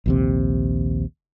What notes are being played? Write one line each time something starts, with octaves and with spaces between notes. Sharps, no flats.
A#1 D#2 C3